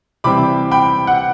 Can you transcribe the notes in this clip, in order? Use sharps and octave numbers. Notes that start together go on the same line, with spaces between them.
C3 E3 G3 C4 B5 D6
G5 B5
F#5